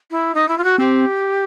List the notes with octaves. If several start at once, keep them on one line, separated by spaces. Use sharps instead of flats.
E4
D#4
E4
F4
F#4
C4 G4